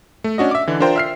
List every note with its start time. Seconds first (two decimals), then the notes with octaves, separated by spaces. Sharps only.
0.24 A3
0.38 C#4 D4 F#4 D#5
0.51 E5 D6
0.67 D3 E3
0.80 D4 F4 A#4 C5 G5
0.96 E5 F6 C7